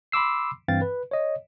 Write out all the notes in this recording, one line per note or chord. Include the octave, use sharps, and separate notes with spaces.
B5 C6 D6 E6 C7
G2 E3 C4 F5 G5 A6
B4
C#5 D#5